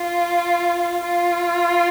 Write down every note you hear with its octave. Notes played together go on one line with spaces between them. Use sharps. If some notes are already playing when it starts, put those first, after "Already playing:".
Already playing: F4
F4